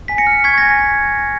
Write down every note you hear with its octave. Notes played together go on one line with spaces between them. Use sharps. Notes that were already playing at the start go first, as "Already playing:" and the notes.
G#5 B6
A#6 C#7
F6
C#6 G#6 B6
A#6
G#5
A#6